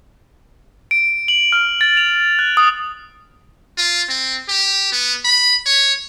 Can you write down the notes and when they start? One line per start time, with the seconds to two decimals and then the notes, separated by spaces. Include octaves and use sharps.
0.91 D7
1.28 F#7
1.52 F6
1.81 A6
1.97 F7
2.39 F#6
2.57 D#6
3.78 F4
4.09 C4
4.49 G4
4.92 B3
5.25 B5
5.66 C#5